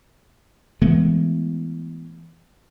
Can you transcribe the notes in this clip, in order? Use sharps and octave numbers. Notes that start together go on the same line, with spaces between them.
E3 G#3 A3 B3